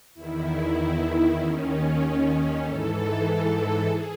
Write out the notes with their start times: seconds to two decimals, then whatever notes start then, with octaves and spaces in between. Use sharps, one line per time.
0.14 E2 D#3 E4
1.38 D#2 D#3 C#4
2.62 G#2 E3 A4
3.24 A4
3.86 G#4